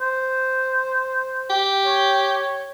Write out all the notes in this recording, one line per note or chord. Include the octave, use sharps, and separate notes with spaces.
C5
G4
C#5